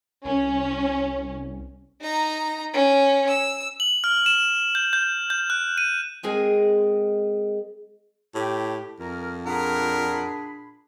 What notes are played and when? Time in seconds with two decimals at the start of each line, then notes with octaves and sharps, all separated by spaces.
0.25 C2 C#4
2.01 D#4 A#5
2.73 C#4
3.28 E6
3.80 F#7
4.04 F6
4.26 E7
4.75 G6
4.93 G6
5.30 G6
5.50 F#6
5.78 D#7
6.23 G#3 C4 G#4 A#4 D#5 G#5
8.35 A2 G4
9.00 F2 A#4
9.46 A#2 D4 G#4 A#4 F#5 B5